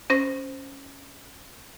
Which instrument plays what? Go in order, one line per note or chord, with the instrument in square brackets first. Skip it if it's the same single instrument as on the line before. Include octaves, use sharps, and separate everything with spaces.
[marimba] C#4 C5 A#6